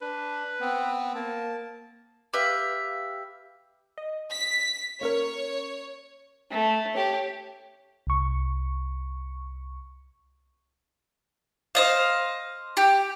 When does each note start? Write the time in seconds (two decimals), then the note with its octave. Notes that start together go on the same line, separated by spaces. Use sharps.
0.02 D4 B4
0.61 B3 C4
1.15 A#3 A5
2.33 G4 B4 E5 F5
3.98 D#5
4.31 B6
5.01 A#3 C#4 A#4 C#5
6.51 A3
6.94 G4 C#5
8.07 C2 C#6
11.75 C5 D#5 F5
12.77 G4